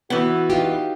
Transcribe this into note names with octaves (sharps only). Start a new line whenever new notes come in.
E3 B3 F#4
D#4 F4 G4